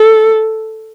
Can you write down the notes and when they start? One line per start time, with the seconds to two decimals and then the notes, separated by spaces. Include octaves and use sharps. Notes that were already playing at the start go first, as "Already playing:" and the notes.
Already playing: A4